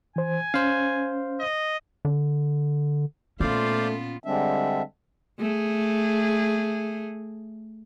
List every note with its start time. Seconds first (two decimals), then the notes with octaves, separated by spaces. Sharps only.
0.16 E3 C5 G#5
0.54 C#4 C5 F5
1.40 D#5
2.05 D3
3.40 A#2 A3 B3 C#4 F4 C5 D5 F5
4.24 D3 G3 G#3 C4 D4 E5
5.39 A3 G#4